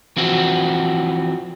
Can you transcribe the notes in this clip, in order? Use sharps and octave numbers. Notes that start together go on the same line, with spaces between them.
E3 F3 C4 E4 F#4